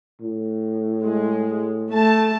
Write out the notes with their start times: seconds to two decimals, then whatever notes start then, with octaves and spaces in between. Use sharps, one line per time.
0.22 A2
1.03 G#3
1.91 A3 A5